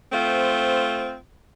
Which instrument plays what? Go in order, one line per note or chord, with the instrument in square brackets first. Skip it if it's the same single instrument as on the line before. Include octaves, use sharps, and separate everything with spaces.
[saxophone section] A3 C4 F4 C5